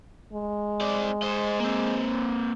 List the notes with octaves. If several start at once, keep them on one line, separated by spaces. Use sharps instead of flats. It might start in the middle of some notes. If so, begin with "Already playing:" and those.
G#3
C4 D5
C5 D#5
A#3 C4